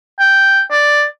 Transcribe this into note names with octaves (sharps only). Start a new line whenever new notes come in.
G5
D5